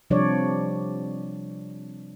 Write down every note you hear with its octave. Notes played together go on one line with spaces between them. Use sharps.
C3 F3 G3 D4 C#5 D5